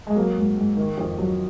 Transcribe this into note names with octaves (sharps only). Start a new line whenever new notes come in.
G#3
F#3 A#3
G#2
G#2
D#3
F2
F#3